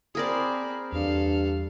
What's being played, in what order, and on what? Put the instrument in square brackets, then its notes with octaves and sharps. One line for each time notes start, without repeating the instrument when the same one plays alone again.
[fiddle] C4 B5 [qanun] G#4 A#4 D5
[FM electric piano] E2 D4 [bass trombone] G2 [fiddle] A4 F5